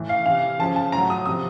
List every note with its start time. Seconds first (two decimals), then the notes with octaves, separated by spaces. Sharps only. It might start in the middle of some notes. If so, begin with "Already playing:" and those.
Already playing: A2 E3
0.09 F5
0.26 C3 E3 F5
0.59 C#3 F3 A5
0.76 A5
0.92 A2 F#3 A#5
1.10 D#6
1.26 C3 F3 D#6